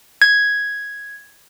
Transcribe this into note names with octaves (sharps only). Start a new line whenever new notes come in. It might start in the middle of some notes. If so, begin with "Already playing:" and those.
G#6